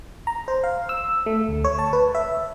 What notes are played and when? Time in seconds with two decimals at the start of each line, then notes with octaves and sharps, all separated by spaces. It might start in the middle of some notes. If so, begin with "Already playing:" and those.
0.27 A#5
0.48 C5
0.64 F5
0.89 E6
1.26 A3
1.48 D2
1.64 C#5
1.79 A5
1.93 B4
2.15 E5